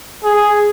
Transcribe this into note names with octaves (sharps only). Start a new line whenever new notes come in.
G#4